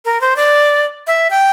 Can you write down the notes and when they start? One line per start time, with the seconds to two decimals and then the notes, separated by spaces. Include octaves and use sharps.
0.05 A#4
0.21 C5
0.36 D5
1.07 E5
1.30 G5